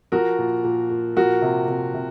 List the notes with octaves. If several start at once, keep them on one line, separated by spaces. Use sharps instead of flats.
F3 F#4 A#4
A#2
A#2
A#2
F3 F#4 A#4
C3
C3
C3